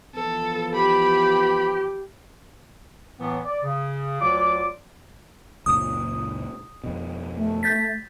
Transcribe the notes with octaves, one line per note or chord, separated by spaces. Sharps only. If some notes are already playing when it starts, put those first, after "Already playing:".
E3 F3 B3 A4
G4 B5
A2 E3 F#3 B3
D5
C#3
D2 F#3 F4 D5 D6
C#2 F#2 A#2 D#6
F2 B2
A3
G6 A6 B6